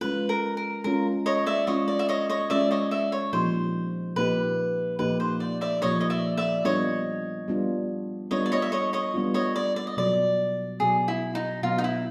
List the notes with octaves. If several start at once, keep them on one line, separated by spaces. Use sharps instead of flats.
G#3 C#4 F4 B4
A#4
A#4
G#3 C#4 F4 A#4
C#5 D#5
D5 E5
G#3 C#4 F4 C#5 D#5
D5
E5
C#5 D#5
C#5 D#5
G#3 C#4 F4 D5 E5
C#5 D#5
D5 E5
C#5
A#2 F3 A#3 D#4 G4 C5
A#2 F3 A#3 D#4 G4 B4
A#2 F3 A#3 D#4 G4 B4
C5
D5
D5 E5
A#2 F3 A#3 D#4 G4 C#5 D#5
D#5
D5 E5
D5 E5
G3 B3 D4 F4 C#5 D#5
G3 B3 D4 F4
G3 B3 D4 F4 C#5 D#5
D5
C#5 D#5
E5
C#5 D#5
C#5 D#5
G3 B3 D4 F4
C#5 D#5
D5
D5
D#5
B2 F#3 B3 D5
B2 F#3 B3 G#4
E4
D#4
B2 F#3 B3 F4
D#4
E4